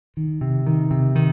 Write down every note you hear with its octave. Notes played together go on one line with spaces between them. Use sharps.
D#3
C3
D#3
C3
D#3